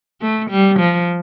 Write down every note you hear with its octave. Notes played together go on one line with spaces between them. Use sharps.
A3
G3
F3